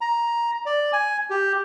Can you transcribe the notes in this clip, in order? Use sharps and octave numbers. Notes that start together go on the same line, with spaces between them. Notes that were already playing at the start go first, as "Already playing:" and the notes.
A#5
D5
G#5
G4